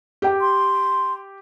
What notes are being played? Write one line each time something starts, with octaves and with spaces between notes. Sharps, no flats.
G4 G5 D6
C6